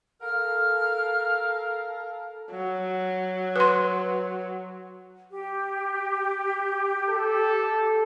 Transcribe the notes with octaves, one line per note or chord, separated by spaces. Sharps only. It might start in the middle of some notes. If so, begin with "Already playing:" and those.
A4 A#4 F5 F6
F#3
B4 C6
G4
A4